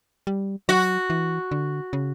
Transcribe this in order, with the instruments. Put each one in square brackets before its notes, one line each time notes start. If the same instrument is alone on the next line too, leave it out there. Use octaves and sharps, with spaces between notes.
[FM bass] G3
[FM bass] F#3 [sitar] F#4
[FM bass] E3
D3
C#3